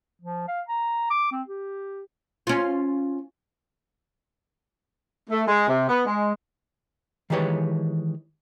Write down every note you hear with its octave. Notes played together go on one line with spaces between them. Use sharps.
F3
F5
A#5
D6
C4
G4
C#4 F4
A3
G#3
C3
B3
G#3
D#3 E3 G#3 G4 B4 C#5